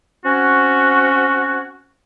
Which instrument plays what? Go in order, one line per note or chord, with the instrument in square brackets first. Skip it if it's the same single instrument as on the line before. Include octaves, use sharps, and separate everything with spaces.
[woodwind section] C4 C#4 F#4